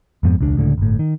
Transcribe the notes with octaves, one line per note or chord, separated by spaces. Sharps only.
F2 G#2 F3 B3
E1 C#2 D4
C#2 A2 D3
G1 A2
D#3